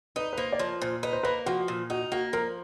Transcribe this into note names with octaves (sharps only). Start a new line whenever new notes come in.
D#4 B4
B4
A#3 C5
D5
F3 C#5
A#2 C5
D#4 B4
C5
A#3 B4
F3 F#4
A#2
D#4 F#4
A#3 F#4
F3 A#4